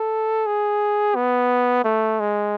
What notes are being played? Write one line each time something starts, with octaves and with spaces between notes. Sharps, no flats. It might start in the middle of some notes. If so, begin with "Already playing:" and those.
Already playing: A4
G#4
B3
A3
G#3